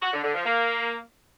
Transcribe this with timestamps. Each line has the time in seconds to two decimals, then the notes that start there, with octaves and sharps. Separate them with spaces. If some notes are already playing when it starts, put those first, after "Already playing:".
0.02 F#4
0.12 D3
0.23 D3
0.34 F3
0.45 A#3